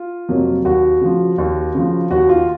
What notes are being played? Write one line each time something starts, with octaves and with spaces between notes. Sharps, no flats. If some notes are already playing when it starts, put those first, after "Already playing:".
Already playing: F4
F2 C3 F#3 A#3
D#2 F#4
C#3 F3
D#2
C#3 F3
D#2 F#4
F4